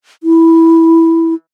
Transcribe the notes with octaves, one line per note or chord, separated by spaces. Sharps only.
E4